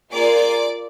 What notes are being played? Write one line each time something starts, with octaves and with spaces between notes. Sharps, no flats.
A#3 F4 G#4 D5 D6